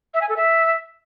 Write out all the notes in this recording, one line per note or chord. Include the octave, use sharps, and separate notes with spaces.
E5
G#5
A4
E5